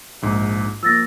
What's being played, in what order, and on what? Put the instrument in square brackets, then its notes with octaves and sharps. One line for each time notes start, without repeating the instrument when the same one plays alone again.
[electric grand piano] A#1 G#2
[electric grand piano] F3 A#3 [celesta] E6 A6 A#6